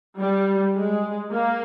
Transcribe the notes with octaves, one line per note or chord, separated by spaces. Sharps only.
G3
G#3
A#3